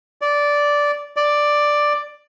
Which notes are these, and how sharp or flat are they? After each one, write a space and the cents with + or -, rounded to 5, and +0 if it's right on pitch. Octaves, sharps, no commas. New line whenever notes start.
D5 -10
D5 +5